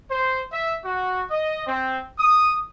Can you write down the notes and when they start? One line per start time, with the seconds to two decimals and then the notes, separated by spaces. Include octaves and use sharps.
0.10 C5
0.52 E5
0.84 F#4
1.30 D#5
1.66 C4
2.19 D#6